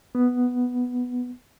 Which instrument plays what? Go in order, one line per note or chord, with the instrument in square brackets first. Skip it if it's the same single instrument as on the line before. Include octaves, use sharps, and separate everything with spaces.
[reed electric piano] B3